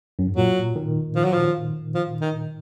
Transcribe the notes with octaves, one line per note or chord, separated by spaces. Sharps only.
F#2
G#2
A#2 F#3
D#3
F3
F#3
F3
F3
D#3